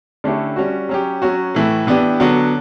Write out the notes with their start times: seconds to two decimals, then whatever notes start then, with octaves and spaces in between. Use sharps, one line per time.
0.24 D3 A3 C#4 E4 G4
0.56 G3 C#4 F#4
0.89 F#3 C#4 G4
1.22 F#3 C#4 F#4
1.55 A2 E3 A3
1.87 E3 B3 D4 G4
2.20 D3 F#3 B3 F#4